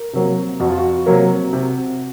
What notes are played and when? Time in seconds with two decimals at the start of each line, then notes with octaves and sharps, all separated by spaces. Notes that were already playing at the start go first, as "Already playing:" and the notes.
Already playing: A#4
0.13 C3 F#3 A#3
0.60 F2 F#4
0.69 F4
0.78 F#4
1.06 C3 F#3 A#3
1.53 C3